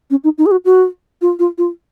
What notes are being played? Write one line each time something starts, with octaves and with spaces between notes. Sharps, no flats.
C#4
D#4
D#4
G#4
F#4
F#4
F4
F4
F4